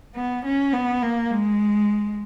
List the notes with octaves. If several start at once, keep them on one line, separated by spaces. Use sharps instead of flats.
B3
C#4
B3
A#3
G#3